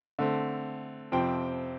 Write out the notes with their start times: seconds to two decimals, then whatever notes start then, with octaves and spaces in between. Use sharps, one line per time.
0.19 D3 A3 C4
1.12 F2 C3 F3 C4 G5